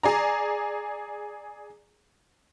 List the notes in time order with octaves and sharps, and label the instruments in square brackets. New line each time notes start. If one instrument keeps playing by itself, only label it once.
[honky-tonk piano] G#4 D5 A#5